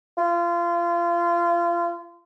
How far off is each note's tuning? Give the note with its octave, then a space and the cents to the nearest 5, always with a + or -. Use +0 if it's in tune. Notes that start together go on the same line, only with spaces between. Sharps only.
F4 -25